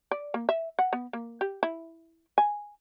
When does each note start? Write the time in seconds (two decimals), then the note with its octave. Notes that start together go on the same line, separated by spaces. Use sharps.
0.11 D5
0.34 A#3
0.49 E5
0.79 F#5
0.93 B3
1.13 A#3
1.41 G4
1.63 E4
2.38 G#5